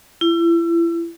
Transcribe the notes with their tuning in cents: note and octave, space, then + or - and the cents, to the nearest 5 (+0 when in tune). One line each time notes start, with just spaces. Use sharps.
E4 +35